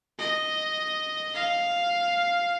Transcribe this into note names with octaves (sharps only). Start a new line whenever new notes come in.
D#5
F5